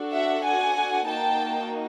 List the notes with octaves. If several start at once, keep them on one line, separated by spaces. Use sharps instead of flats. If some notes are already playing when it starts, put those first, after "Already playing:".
Already playing: D4 F#4 A4
E5 F#5
F#5 G#5
A#3 D#4 F#4 G5 A5